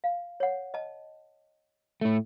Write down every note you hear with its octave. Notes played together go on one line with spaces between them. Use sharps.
F5
C#5 F#5
D#5 A5
A2 A3